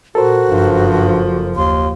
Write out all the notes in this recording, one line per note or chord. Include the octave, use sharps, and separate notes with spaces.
A#2 F#4 A4 A#4 C5
F#1 G2 F3
D#2 C6